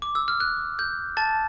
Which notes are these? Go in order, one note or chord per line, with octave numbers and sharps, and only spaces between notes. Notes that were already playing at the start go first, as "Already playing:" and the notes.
D6
E6
F6
F#6
G6
A5 A6